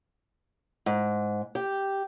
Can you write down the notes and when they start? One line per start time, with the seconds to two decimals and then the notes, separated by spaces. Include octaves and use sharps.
0.86 G#2
1.55 G4